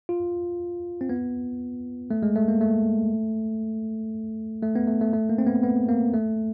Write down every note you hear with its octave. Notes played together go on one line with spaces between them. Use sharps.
F4
C4
B3
A3
G#3
A3
A#3
A3
A3
B3
A3
A3
A3
A#3
C4
B3
B3
A#3
A3